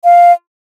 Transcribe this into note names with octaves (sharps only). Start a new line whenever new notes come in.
F5